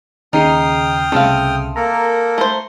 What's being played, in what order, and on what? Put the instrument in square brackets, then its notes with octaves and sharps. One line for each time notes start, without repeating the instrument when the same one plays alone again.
[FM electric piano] D#2 C#3 C7 [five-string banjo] D#4 [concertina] G5 D#6 F6
[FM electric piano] C2 C#3 [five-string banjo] A3 C4 F5
[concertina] A#3 A4 A#4 [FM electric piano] A#5
[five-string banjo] A3 C5